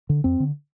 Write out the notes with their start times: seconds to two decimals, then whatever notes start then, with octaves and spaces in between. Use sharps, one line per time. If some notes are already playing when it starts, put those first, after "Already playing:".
0.09 D3
0.24 F2 C4
0.40 D3